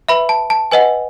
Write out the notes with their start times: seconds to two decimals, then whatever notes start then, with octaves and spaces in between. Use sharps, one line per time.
0.09 B4 E5 B5
0.29 A5
0.50 A5
0.71 B4 D#5 F#5 G#5